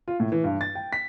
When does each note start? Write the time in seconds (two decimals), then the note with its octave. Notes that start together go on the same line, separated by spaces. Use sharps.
0.08 F4
0.20 A2
0.32 E3
0.44 G2
0.61 A6
0.75 G5
0.93 B6